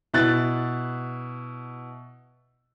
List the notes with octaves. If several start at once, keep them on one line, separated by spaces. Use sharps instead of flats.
B2 E4 F#6 A6